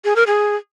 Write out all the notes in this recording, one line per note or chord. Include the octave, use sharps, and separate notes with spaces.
G#4
A#4
G#4